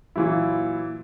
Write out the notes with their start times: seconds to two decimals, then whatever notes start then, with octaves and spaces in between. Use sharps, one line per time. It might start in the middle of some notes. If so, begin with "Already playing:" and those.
0.16 A#2 E3 F#3 E4